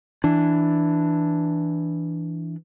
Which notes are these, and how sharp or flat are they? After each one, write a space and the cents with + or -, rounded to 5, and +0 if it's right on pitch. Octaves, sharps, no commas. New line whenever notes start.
E3 +0 D4 +0